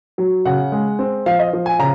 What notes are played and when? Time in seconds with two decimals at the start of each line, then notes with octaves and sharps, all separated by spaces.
0.18 F#3
0.45 C#3 F#5
0.72 G#3
0.99 C4
1.26 F3 F5
1.39 D#5
1.53 F3
1.66 G#5
1.79 C#3 A#5